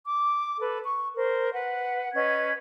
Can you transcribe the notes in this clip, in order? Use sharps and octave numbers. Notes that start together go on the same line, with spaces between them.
D6
A4 B4
C#6
A#4 C5
B4 F#5
C#4 B4 D#5 G#6